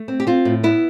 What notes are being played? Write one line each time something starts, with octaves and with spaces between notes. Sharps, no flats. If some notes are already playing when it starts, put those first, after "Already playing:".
Already playing: A3
C4
G4
C4 F4
A2
B3 E4